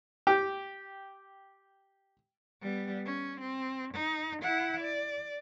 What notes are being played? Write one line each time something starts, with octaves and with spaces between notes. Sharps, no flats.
G4 G5
G3 B3
C#4
C4
D#4
E4 F#5
D5